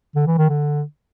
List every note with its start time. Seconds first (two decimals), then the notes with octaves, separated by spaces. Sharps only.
0.16 D3
0.27 E3
0.38 D#3
0.49 D3